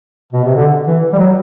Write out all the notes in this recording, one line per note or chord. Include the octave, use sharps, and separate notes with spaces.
B2
C3
D3
E3
G3
F#3